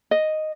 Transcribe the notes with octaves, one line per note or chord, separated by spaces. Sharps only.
D#5